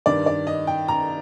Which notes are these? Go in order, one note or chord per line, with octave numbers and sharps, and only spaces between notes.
G2 D#3 D5
D5
D#5
G5
A#5